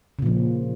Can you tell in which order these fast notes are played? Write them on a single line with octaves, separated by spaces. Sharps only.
C#3 A#2 F3